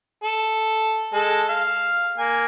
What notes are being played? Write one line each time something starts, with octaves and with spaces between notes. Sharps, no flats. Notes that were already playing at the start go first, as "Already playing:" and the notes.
A4
G#3 A4
F5
A#3 G#5